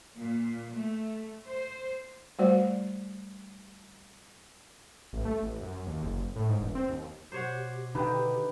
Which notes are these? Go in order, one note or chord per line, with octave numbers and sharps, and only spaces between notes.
A#2
A3
C5
G3 A3 F#4 C5 D5
A1
A3
A1
F#2
D#2
F#1
A2
G#2
E1
C4
D#2
B2 G4 C5 C#5 F#5
D3 D#3 B4 G5